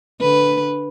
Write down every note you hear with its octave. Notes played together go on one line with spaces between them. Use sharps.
D3 B4